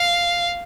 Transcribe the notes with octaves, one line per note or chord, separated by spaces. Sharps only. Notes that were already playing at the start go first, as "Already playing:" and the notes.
Already playing: F5